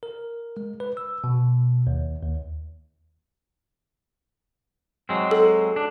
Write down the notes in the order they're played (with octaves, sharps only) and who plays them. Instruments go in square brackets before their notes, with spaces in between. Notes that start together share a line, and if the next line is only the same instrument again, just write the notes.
[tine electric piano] A#4
G#3
B4
E6
B2
D#2
D#2
[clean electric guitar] F#3 G#3 C4
[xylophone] A4
[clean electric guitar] D4